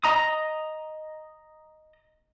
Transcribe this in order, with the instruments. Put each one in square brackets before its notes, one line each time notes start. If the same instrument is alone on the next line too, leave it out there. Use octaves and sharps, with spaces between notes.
[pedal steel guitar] D#5 A#5 D#6